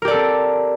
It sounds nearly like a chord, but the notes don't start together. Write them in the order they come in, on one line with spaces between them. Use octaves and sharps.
A#4 G4 D5 A4 C4